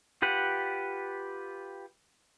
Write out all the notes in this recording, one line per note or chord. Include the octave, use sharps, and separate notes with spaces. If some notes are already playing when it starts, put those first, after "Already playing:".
F4 G4 B4 F#5